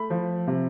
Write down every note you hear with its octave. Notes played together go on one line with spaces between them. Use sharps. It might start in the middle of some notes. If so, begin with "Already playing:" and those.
Already playing: A3 B5
F3
C3